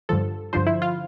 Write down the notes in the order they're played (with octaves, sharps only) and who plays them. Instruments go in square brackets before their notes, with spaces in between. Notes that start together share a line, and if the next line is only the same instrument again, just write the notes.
[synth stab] G2 D3 F3 A4
G2 D3 F3 C5
E4
F4